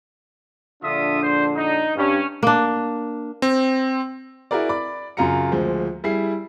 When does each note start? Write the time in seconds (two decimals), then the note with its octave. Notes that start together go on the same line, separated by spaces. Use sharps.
0.83 A#1 D3 D4 F4 E5 D#6
1.23 C5
1.56 D#4
1.97 G2 C#4
2.43 A#3 D4
3.42 C4
4.51 E4 F#4 G#4 A#4 D5
4.69 D5 B5 D6
5.17 F#2 C#3 F4 G#4 A#5 C#7
5.52 D2 F3 G#3
6.04 G3 E4 G#4 C7